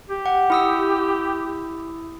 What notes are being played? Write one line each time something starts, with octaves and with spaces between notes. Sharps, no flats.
G4
F#5
E4 D#6 E6